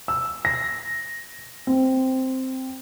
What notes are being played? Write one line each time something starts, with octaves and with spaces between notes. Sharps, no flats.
E6
A#6
C4